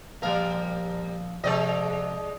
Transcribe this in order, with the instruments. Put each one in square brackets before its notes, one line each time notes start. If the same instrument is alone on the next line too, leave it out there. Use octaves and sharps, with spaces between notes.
[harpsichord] A#1 F3 F5 [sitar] G3 A#4
[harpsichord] F2 C3 C6 [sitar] G#3 D5 D#5